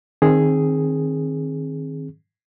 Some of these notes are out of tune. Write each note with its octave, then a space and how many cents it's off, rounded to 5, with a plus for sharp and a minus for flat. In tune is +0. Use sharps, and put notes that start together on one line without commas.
D#3 +0 C4 +25 G#4 +0